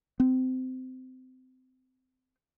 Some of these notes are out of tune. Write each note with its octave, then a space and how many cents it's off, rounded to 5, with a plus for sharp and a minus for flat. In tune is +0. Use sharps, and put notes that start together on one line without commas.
C4 -25